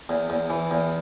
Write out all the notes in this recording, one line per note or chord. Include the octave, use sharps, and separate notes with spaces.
E2
E2
E3
E2